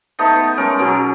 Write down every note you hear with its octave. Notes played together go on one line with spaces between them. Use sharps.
A3 B3 D#4
B3
G#3 C#4 A#4
B2 F#3 C#4